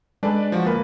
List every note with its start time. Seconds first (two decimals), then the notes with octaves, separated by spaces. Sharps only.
0.23 G#3 D4 A4 B4 D5
0.52 F3 F#4
0.65 D2 A#3 A#4 B4